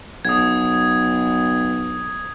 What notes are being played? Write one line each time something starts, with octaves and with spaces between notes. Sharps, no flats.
B1 D#6 G#6